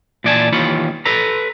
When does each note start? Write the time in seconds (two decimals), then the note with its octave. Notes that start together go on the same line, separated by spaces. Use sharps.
0.24 A#2 E3 D5 G#5 A5
0.52 D#2 E3 F4 C#5 B5
1.05 A4 B4 A#5